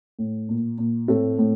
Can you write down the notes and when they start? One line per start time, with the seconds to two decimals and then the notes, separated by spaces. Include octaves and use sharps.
0.19 A2
0.49 A#2
0.78 A#2
1.08 A2 A3 C4
1.39 A2